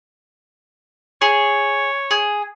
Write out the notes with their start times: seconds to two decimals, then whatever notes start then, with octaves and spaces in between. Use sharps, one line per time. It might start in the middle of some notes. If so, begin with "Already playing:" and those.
1.22 G#4 C#5
2.11 G#4